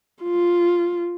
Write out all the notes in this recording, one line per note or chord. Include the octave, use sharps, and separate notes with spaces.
F4